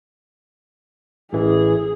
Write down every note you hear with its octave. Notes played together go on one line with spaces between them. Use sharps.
A1 E3 G#4